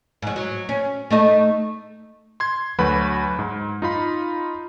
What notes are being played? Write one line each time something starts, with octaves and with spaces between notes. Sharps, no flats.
G#2 F#3
F#3
C#4
A3 D#4 D#5
C6 G#6
D2 F#3 F#4 B4 B5
G#2
D#4 F4 B5